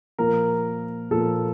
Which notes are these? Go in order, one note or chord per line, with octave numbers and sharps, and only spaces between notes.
A#2 F3 A#3 A#4
A#2 F3 A#3 A4